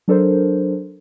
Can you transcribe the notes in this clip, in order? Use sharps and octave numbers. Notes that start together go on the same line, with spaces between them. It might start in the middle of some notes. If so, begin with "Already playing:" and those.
F#3 D4 A4 A#4 C5